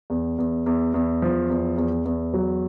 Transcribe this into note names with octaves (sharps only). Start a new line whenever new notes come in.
E2
E2
E2
E2
F3
E2
E2
E2
F#3